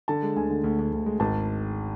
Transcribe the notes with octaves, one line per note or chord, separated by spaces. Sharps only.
D3 A5
G#3
D2 G#5
D3
D2
D2
D2
G#3
G#1 A5